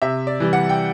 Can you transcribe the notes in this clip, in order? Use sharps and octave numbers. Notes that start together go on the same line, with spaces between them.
C3 E5
D5
E3 G3
F#5
G5